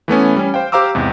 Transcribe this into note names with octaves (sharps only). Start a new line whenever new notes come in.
E3 A3 B3 C#4
G3 C#4
C5 F5 G5
G4 C5 F5 A#5 D6 E6
E2 G#2 C3